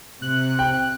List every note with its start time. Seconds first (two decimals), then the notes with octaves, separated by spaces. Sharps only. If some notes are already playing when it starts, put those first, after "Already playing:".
0.22 C3 F#6
0.59 G5